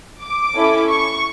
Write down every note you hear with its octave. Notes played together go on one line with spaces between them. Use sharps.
D6
C#4 E4 A4
C#6